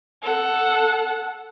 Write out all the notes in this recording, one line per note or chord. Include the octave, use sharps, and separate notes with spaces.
A4 F#5